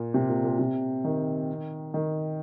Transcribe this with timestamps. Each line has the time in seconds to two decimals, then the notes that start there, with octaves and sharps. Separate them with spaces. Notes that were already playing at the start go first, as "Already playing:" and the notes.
Already playing: A#2
0.14 C3
0.29 A#2
0.44 A#2
0.59 C3
1.04 D#3
1.94 D#3